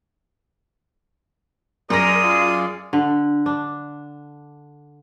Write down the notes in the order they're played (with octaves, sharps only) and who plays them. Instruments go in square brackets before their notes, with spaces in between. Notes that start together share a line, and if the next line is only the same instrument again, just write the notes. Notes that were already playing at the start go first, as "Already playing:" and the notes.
[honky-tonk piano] F#2 A#6 [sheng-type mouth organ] G#4 D5 [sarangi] A#4 [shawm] D#6
[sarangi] F4
[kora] D3
D4